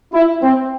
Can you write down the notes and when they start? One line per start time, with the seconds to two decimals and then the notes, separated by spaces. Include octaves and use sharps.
0.13 E4
0.42 C4